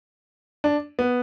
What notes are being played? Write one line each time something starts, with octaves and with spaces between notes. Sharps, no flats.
D4
B3